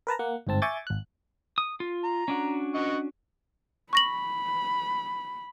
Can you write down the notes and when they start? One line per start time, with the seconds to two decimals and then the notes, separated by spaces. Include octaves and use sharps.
0.07 A#4 B4 A5 A#5
0.19 A#3 F#5
0.47 G1 G#2 C4 A5
0.62 E5 G#5 C#6 D6 G6 A6
0.87 G#1 F#6
1.58 D#6
1.80 F4
2.04 A#5
2.28 C#4 D4 F#4
2.75 D#5 F#5 C#6
3.93 B5 C#6 A#6 F#7